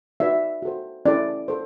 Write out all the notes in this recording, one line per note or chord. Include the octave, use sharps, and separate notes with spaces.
D#4 F#4 B4 D5 E5
F#4 A4 C5
C#4 E4 A4 D5
A4 C5